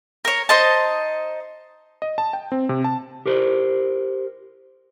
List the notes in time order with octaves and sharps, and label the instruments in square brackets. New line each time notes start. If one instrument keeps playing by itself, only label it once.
[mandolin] A#4 C#5
D#4 C5 D#5 A5
[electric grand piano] D#5
A5
G5
C4
C3
A5
[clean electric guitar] G4 A#4 C5